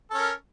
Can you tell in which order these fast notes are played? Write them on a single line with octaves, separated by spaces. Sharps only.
A4 C#4 A#4